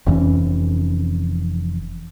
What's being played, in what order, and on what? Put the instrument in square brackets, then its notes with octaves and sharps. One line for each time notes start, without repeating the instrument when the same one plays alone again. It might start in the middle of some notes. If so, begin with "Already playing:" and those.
[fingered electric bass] F1 F2 E3 C#4